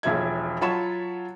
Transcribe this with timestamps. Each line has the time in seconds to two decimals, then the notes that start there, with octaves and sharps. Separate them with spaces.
0.03 E1 B1 F3 E5 G#6
0.61 F#3 F4 C#5 A5 B5 E7